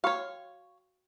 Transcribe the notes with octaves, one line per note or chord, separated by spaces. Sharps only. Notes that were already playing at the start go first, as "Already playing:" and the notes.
F#4 C#5 F5 G5 C#6